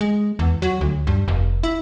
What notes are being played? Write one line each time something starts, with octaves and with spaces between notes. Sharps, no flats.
G#3
E2
F#3
D2
G2
F1
E4